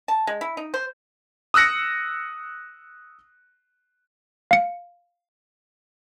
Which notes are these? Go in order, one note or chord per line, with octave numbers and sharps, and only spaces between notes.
A5
G#3
E4
D#4
C5
D#6 E6 F#6 A#6 C#7
F5 C#7